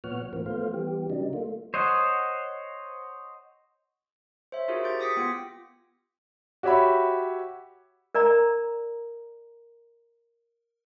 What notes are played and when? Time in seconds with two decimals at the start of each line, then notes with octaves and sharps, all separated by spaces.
0.04 A#2 F3 B3 C#5 F#5 F6
0.33 A2 E3 F3 A#3 C4
0.46 F3 A3 B3 C5 F5
0.74 E3 G3 B3 G4
1.10 C#3 F#3 G3 D4 D#4
1.33 A3 A#3 F4
1.74 C5 C#5 D#5 F#5
4.52 C5 C#5 E5
4.68 D#4 F4 F#4 G#4 A#4 C5
4.84 G4 G6 A6 D7
5.00 D6 D#6 A#6 B6 C#7
5.17 B3 F4 G5 C#7
6.63 F#4 G4 C#5 E5 B5
8.15 A#4 D5 A#5